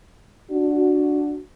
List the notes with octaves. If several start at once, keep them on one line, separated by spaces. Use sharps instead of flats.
D4 F#4